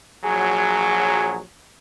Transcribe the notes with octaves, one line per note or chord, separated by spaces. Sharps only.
A#1 F#3 G#4